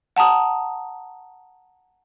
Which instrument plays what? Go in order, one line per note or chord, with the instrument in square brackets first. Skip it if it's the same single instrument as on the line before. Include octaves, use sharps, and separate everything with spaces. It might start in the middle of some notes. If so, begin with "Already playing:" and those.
[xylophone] F#5 A5 A#5 D#6